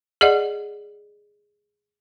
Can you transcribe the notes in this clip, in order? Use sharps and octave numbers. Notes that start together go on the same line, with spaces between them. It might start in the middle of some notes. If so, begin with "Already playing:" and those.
G#4 D5 D#5 F#5